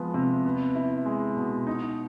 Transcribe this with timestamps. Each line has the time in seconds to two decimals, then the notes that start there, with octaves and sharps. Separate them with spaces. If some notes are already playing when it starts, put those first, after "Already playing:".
Already playing: F3 G#3 B3
0.14 C3
0.45 B3
0.75 E4
1.06 G#3
1.36 B2
1.67 D#4